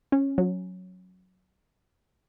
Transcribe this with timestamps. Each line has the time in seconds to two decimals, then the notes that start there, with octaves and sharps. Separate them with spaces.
0.12 C#4
0.38 F#3